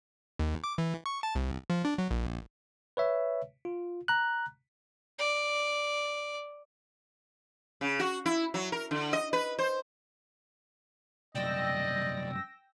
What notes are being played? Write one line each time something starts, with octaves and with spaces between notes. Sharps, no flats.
D#2
D6
E3
C#6
A5
C2
F3
D4
F#3
A#1
B4 C#5 E5
F4
A#5 F#6
D5
C#3
F#4
E4
F#3
A#4
D3
D#5
B4
C5
C2 F#2 D5 D#5 G5 E6 A#6